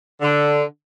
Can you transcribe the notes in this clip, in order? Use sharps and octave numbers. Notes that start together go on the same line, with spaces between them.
D3